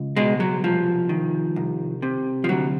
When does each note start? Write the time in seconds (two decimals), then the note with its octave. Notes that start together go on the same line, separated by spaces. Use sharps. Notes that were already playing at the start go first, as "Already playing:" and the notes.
Already playing: C#2
0.16 B2 G#3
0.40 F#3
0.64 C2 F3
1.09 D#3
1.56 C2
2.02 C3
2.44 F3
2.49 D2 F#3